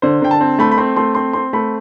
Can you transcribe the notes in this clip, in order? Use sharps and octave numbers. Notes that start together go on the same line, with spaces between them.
D3 C5
D3 G5
A5
C4
A3 B5
B5
C4 C6
A3 C6
C4 C6
C4 C6
A3 B5